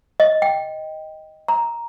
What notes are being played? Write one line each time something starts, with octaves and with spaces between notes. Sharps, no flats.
D#5
G5
A#5